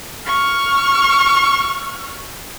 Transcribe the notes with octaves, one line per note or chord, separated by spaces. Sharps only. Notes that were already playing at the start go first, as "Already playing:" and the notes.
C#6 F6